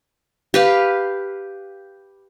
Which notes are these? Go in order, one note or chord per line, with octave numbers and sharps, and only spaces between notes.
G4 B4 F5